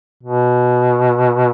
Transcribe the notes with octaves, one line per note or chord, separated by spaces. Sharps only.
B2